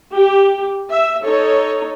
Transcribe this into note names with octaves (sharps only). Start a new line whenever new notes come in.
G4
E5
D#4 A4 C#5